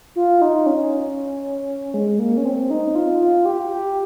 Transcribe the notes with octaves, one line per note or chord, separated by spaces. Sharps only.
F4
D#4
C#4
G#3
A#3
C#4
C4
D#4
F4
F4
G4
G4